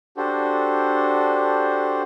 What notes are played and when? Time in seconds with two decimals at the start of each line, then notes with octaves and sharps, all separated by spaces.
0.17 D4 F#4 G4 A4 C5